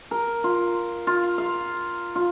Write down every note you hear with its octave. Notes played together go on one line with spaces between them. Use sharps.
A#4
F4
F4
F5
F4